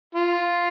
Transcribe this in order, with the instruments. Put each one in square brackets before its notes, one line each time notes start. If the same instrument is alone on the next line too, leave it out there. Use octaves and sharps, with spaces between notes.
[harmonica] F4